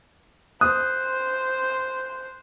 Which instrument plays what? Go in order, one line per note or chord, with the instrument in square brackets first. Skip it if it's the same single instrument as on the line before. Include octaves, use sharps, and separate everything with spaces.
[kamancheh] C5 [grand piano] D#6 [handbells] F#6